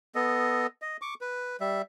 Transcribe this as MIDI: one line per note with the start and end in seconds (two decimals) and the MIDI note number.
0.15 0.67 59
0.15 0.67 69
0.15 0.67 75
0.82 0.97 75
1.02 1.14 85
1.02 1.14 86
1.21 1.56 71
1.61 1.82 55
1.61 1.82 76